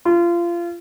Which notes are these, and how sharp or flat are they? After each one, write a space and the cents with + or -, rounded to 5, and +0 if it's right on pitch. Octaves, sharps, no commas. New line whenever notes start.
F4 -25